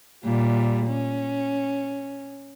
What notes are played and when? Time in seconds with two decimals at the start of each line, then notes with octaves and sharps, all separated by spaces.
0.24 A#2 G3
0.86 C#4